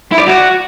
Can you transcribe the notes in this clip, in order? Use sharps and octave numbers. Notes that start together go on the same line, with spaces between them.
E4
D5
F#4